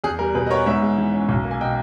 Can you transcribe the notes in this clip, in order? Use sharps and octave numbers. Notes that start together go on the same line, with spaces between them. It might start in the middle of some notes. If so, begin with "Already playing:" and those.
E2 G#4
G3 A#4
B2 G#4 B4
D#5
B3 A#4 C#5
G#2 C#5 E5
G#3
E3
C#4
B1
A#3
G#5
B2 D#5 G5